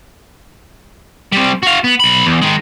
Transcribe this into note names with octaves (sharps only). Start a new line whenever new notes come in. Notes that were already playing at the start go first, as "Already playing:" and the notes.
G3 C4
F#4 F5
B3
B1 B5
E2
D#3 G#3